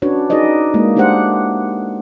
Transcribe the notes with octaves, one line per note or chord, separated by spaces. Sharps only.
C#4 D4 F#4 B4 C#5
D#4 F#4 G#4 B4 D5 D#5
G#3 A#3 E4
A3 D4 G4 G#4 C5 F#5